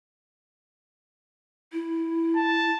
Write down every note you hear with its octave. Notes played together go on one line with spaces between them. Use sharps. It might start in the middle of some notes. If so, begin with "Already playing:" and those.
E4
A5